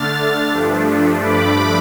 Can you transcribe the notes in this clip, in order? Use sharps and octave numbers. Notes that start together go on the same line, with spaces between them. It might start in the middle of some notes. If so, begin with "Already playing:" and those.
Already playing: D3 A3 D4 F6 A6
G2 F3 A3 D4
B5 D6